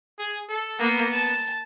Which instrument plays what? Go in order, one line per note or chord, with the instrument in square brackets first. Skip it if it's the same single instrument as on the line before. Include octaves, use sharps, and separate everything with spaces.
[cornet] G#4
A4
[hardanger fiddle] A#3 [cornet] B3
[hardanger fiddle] A5